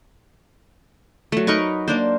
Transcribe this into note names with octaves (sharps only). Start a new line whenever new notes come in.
F#3 A3
D#4 A#4 B4 C#6
A#3 D4 C5